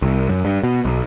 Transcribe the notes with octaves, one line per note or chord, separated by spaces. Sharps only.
C2
F#2
G2
B2
B1